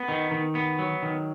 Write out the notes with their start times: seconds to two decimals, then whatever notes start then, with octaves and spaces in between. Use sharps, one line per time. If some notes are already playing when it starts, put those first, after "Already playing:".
Already playing: B3
0.08 D#3
0.31 D#3
0.55 B3
0.79 F#3
1.02 D#3